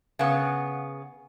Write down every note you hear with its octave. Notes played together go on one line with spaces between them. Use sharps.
C#3 B3